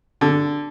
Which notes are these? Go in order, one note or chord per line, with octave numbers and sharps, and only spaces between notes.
D3